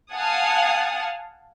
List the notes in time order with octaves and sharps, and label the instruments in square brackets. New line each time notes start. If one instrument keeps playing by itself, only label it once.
[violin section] F5 F#5 G#5 A5 D#6